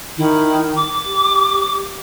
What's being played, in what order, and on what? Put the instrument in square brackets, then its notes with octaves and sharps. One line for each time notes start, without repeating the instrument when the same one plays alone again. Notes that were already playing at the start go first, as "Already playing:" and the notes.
[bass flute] D#3 [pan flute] E4
[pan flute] D6
[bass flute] G4